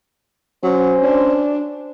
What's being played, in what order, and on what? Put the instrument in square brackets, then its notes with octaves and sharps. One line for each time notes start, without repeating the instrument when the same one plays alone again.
[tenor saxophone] F#3 [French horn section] C#4 C5
[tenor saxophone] D4